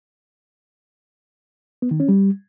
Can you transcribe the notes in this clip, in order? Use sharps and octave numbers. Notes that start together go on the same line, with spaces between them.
B3
D#3
C#4
G3